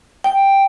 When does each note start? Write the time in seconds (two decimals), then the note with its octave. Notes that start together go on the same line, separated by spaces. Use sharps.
0.24 G5